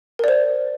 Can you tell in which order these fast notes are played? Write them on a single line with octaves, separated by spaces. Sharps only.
A#4 D5 C5